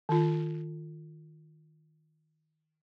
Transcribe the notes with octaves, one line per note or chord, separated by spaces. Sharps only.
D#3 F4